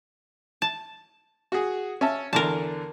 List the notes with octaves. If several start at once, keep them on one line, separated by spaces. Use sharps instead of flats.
A5
F#4 G#4
C#4 E5 A5
E2 D3 A#4 A5